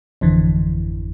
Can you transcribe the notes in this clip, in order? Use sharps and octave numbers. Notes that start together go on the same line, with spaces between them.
G#1 F2 D3 E3